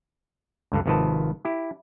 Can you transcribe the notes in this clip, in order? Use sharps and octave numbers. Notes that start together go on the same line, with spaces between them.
C#2 G2 D3
G#1 C3 D#3 F3 B4 A5
E4 G4